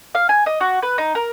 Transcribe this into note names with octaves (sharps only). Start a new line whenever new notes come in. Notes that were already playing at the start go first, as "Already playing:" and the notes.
F5
G#5
D#5
F#4
B4
D#4
A#4